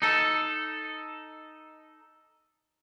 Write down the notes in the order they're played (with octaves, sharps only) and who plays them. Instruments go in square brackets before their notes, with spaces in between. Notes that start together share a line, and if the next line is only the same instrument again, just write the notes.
[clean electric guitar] D#4 A4